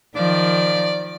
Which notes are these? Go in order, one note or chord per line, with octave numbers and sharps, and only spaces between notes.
D#3 F3 D5